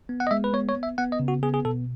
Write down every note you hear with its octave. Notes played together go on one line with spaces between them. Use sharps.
B3
F#5
D#5
G#3 E5
B4
B3 C#5
C#5
B3
E5
B3 F#5
D#5
C#3
F#4
B3 G#4
G#4
B2 A4